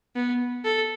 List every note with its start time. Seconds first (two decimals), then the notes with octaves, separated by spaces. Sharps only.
0.16 B3
0.65 A4